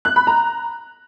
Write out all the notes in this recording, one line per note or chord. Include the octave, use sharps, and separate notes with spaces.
F#6
B5
A#5